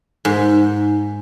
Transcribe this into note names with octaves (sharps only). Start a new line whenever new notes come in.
G#2